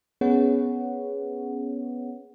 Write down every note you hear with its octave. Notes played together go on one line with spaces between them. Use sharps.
B3 C#4 G#4 B4 C#5 F#5